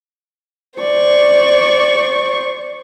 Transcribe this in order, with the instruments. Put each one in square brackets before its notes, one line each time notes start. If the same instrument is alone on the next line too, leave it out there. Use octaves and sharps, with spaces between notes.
[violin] C5 C#6 [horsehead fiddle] D5